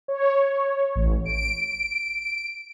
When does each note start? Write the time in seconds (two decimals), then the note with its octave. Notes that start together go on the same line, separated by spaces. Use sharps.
0.08 C#5
0.95 A1
1.25 D7